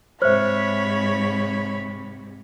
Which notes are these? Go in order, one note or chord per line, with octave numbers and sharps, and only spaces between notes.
G#2 C3 C5 C#5 E5 B5 F6